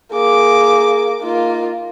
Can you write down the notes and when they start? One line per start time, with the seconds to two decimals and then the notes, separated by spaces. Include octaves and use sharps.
0.13 A#3 G#4 D6
1.22 A#3 D#4 F4